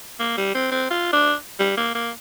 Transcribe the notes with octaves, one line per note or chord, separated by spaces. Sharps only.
A#3
G3
C4
C4
F4
D4
G3
A#3
A#3